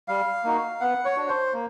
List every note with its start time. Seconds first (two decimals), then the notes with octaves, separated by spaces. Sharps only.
0.08 G3 F5
0.44 A#3 D#4 F#4
0.81 B3 F#5
1.05 C#5
1.17 D4 F#4
1.28 C5
1.53 A#3